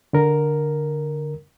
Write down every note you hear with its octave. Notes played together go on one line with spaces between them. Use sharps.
D3 A#4